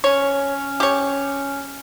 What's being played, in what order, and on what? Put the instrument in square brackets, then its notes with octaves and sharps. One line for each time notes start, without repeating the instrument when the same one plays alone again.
[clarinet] C#4 [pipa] C#5
[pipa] G4 C#5